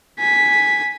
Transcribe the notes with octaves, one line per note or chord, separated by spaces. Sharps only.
G#5 B6